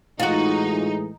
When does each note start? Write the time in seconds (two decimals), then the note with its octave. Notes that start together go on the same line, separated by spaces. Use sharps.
0.20 A2 E3 G#3 D#4 F4 F#4